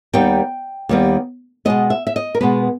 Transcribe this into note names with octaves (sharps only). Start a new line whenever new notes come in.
D#2 D#3 G3 B3 G5
D#2 D#3 G3 B3
B2 G#3 B3 D#5
E5
E5
D#5
A#4
B2 G#3 B3 B4